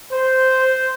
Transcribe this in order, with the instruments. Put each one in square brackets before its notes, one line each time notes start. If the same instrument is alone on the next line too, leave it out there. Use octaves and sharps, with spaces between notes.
[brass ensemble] C5